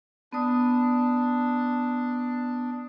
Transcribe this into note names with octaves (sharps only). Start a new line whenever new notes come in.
B3 D4 D#6